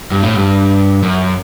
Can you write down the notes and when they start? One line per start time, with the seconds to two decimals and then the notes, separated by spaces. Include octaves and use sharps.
0.11 G2
0.23 A2
0.34 G2
1.03 F#2